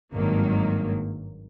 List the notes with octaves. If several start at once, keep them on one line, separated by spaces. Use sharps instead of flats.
G#1 G2 D#3 F#3 A#3